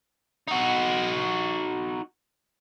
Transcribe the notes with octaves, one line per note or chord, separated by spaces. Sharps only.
D#4 F#4